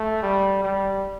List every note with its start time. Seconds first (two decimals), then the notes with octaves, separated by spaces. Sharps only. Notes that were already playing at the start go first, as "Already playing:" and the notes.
Already playing: A3
0.23 G3
0.63 G3